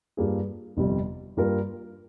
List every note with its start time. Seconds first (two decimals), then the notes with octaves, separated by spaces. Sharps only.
0.17 G2 G3 A#3 F4 G#4
0.77 G1 F2 C3 G3
1.37 G2 G3 A#3 F4 A#4